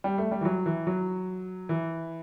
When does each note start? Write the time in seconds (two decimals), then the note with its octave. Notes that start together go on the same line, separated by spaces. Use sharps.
0.04 G3
0.18 A3
0.31 G3
0.41 E3
0.45 F#3
0.66 E3
0.87 F#3
1.69 E3